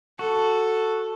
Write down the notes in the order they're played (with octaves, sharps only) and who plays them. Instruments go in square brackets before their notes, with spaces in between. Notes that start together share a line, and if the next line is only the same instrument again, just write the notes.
[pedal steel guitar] F#4 [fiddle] A4